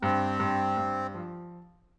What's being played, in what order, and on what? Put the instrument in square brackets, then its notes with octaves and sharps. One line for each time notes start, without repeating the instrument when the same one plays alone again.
[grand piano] G2 [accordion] C4
[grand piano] G2
G2
F3